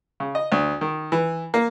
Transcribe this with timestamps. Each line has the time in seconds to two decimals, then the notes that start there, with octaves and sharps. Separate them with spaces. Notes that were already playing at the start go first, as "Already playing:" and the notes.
0.20 C#3
0.35 D#5
0.52 D2
0.81 D#3
1.12 E3
1.54 A#3